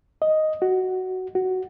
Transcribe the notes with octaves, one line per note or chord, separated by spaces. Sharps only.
D#5
F#4
F#4